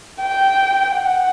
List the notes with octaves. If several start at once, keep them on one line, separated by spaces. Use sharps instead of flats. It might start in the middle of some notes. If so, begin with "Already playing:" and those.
G5
F#5